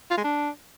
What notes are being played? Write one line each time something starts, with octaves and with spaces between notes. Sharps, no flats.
F4
G#3
D4